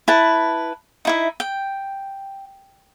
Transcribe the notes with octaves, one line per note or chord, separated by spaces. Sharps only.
E4 B4 A5
D#4 E4 E5
G5